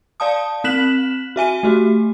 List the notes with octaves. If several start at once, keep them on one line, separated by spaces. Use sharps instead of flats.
D5 F5 A5 D#6
C4 F#6 B6 E7 F#7
F#4 E5 G#5 D#7
A3 F#4 G4